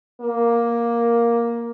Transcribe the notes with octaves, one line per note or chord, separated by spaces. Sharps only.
A#3